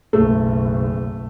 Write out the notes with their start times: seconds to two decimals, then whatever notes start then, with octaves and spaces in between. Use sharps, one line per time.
0.13 F#1 B1 A3